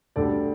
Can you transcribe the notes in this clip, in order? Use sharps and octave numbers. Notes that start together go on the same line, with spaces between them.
D2 D3 G3 A4 D5